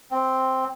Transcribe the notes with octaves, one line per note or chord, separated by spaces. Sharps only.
C4